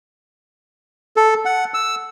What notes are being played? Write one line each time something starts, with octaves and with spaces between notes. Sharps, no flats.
A4
F#5
E6